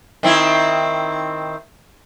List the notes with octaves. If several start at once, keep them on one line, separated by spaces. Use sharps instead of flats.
D#3 C4 E4